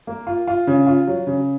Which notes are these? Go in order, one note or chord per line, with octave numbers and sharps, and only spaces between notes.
A#3
F4
F4
C#3
F4
F#3
C#3